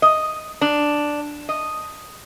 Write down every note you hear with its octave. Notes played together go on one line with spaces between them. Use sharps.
D#5
D4
D#5